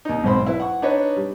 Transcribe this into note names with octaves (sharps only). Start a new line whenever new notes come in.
D#2 D#4
B1 G#2 C4 C5 B5 C6
E4 B4
F#5 C#6
D4 D#4 B4 C#5 D#5
G3